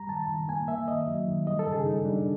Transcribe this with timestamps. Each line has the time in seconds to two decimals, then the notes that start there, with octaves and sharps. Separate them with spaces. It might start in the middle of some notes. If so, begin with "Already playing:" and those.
Already playing: G3 A#5
0.09 D#3 A5
0.29 D#3
0.48 A#3 G#5
0.68 A#3 E5
0.88 D#3 D#5
1.08 F#3
1.28 D#3
1.46 G3 D#5
1.59 A4
1.66 C#3
1.72 G#4
1.86 G3 D#4
2.05 G3 D4